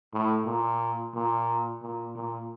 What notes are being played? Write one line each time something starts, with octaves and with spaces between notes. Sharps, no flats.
A2
A#2
A#2
A#2
A#2